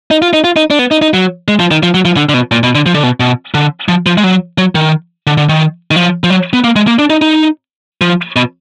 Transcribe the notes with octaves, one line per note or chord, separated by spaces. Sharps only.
D#4
F4
D#4
F4
D#4
D4
B3
D#4
D#4
F#3
G#3
F3
D#3
F3
F#3
F3
D3
D3
B2
A#2
B2
D3
F3
D3
B2
B2
D3
F3
F3
G#3
F#3
F#3
D#3
D3
D3
D#3
D#3
F3
F3
F#3
B3
A#3
G#3
A#3
D4
D#4
D#4
F3
B2